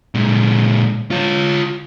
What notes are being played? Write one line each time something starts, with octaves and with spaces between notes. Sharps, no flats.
A#2 G#3
F4 C#5